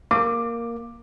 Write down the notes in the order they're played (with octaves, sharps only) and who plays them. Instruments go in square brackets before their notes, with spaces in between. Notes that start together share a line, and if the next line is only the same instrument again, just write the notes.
[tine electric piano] A#3 [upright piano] D6